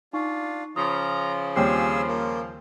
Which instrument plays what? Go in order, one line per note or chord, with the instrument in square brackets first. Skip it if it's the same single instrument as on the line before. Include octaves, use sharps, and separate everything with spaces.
[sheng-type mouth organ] D4 F4 [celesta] D#4 C#6
[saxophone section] C#3 F3 [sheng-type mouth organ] A#5 [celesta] D#6
[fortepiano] D#2 G3 C4 [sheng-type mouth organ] G#4 E6 [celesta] C#5 D6 C7
[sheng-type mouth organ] A#3